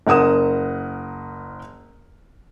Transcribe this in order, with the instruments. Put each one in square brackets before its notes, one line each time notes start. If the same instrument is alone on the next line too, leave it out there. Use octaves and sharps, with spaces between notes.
[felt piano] F#1 A#4 F#5 D#6 E7